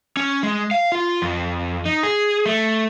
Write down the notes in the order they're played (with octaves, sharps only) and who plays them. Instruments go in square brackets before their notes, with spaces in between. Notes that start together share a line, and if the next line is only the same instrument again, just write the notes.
[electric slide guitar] C#4
G#3
F5
F4
F2
D#4
G#4
A3